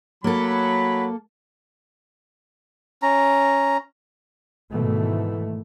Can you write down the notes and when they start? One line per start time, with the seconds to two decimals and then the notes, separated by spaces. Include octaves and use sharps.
0.24 F#3 A#3 A4 B5
3.02 C#4 A#5
4.72 G#2 B2 D#3 E3 A3